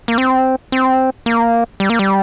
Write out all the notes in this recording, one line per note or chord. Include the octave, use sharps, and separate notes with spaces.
A#3
C4
C4
A#3
G3
A#3
G3